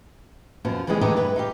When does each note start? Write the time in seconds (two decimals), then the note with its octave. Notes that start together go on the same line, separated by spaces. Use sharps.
0.65 F#2 B2 F3
0.87 E3 F3 G3 G#3 G#4
1.01 D3 E3 G#3 A3 D#4 G4
1.17 G2 B4
1.36 D#4 F4 G4